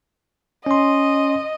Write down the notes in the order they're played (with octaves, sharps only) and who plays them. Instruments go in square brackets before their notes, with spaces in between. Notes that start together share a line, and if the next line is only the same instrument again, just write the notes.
[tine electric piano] C#4 C6 [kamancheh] D#5